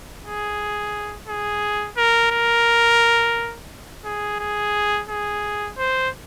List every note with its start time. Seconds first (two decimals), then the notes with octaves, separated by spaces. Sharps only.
0.24 G#4
1.28 G#4
1.97 A#4
2.31 A#4
4.05 G#4
4.40 G#4
5.09 G#4
5.78 C5